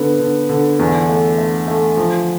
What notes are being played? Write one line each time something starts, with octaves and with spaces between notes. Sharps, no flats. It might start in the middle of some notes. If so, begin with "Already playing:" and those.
Already playing: D3 B3
D3
D3
E2
A3
A3
A3
F3